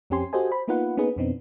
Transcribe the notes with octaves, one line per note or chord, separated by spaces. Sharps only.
F2 C4 C#4 G4 G#5 C6
F#4 G4 A4 C5 D#5 G#5
C5 B5
A#3 B3 D#4 F4 B4 F#5
A#3 B3 C#4 D#4 G#4 B4
F2 B2 B3 C4 D4 D#4